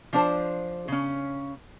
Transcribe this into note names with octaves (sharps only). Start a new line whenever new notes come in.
F3 D4 C5
C#3 C#4